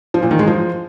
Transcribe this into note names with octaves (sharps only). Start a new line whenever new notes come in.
F3
A#2
D#3
G#3
F3